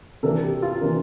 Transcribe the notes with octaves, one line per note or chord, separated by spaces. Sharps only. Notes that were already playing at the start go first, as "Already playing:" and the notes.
C3 E3 A#3 D4 A4
G4
F4
C3 E3 A#3 D4